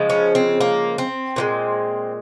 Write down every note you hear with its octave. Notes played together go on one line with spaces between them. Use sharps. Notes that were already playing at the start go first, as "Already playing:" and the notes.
Already playing: C#3 F3 G#3
C#4
C4
A#3
C4
A#2 F3 G#3